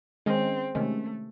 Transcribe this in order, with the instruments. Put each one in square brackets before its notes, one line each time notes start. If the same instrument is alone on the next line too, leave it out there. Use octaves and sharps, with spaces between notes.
[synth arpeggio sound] D#3 G#3 C#4 G#4 D#5 [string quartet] C4
[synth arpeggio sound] C3 D#3 G#3 C#4 [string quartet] A3